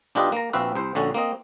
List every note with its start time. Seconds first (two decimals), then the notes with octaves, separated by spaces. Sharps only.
0.15 B1 D4 F4 G4 B4 D#5
0.32 A#3 A#5
0.53 A#1 C4 F#4 B4 E5 F5
0.75 C2 C5
0.95 A#1 D3 C#4 F#4
1.14 A#3 C4 D#5